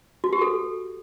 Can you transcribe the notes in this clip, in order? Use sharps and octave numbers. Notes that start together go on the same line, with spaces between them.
F#4
G4
A4